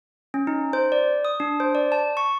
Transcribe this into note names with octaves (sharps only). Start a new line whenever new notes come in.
C#4
D#4
C5
D5
D#6
D4
C5
D5
A5
C#6